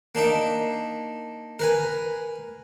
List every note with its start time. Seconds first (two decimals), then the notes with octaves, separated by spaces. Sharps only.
0.15 A#3 D4 D#4 E5
1.59 A#4 B4 G#5